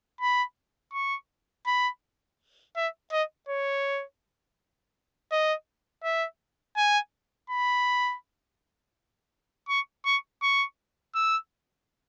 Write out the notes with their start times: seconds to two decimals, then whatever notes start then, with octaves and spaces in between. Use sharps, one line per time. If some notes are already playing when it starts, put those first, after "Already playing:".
0.21 B5
0.94 C#6
1.67 B5
2.77 E5
3.12 D#5
3.49 C#5
5.32 D#5
6.04 E5
6.77 G#5
7.50 B5
9.69 C#6
10.06 C#6
10.43 C#6
11.15 E6